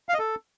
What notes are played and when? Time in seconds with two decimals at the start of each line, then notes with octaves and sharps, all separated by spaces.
0.09 F5
0.14 D#5
0.19 A4